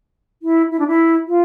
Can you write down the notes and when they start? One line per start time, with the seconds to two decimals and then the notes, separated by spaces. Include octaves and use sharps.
0.42 E4
0.71 E4
0.79 D4
0.87 E4
1.28 F4